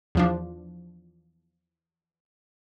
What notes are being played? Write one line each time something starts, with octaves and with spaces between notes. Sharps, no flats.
E2 F3 D4